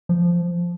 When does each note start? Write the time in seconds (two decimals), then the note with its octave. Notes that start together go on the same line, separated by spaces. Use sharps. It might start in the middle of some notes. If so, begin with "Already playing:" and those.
0.09 F3